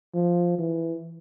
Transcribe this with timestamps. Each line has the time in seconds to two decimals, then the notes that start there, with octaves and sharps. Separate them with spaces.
0.14 F3
0.58 E3